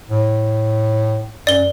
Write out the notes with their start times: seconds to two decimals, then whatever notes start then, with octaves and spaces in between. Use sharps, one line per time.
0.10 A2
1.47 F#2 D5 G7